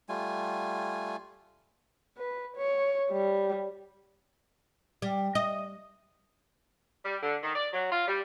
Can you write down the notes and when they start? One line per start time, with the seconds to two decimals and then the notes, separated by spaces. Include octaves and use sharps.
0.09 G3 A3 F4 G#5
2.18 B4
2.57 C#5
3.11 G3
5.02 G3
5.35 D#5
7.04 G3
7.22 D3
7.43 D#3
7.55 D5
7.73 F#3
7.91 F4
8.07 G3